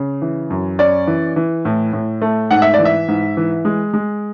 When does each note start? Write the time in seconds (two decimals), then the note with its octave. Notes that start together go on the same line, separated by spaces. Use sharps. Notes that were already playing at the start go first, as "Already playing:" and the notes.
Already playing: C#3
0.22 E3
0.50 F#2
0.79 C#4 D5
1.07 E3
1.36 E3
1.65 A2
1.93 A2
2.22 A3
2.51 G#2 F#5
2.62 E5
2.74 D5
2.79 E3
2.85 E5
3.08 G#2
3.37 E3
3.65 G#3
3.94 G#3